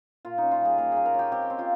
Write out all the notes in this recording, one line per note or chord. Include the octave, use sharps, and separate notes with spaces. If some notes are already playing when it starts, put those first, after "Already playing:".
A#2 F4
C#4 D#4
F4
G3 G#4
A#3 A#4
A#3 G#4
A#4
C#4 G4
C4 G4
C4
F4